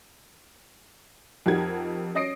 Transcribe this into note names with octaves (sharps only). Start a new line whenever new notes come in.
F2 D#4 G4 A#4 F#5 G#6
C#4 D#5 D#6 A#6 C7 D7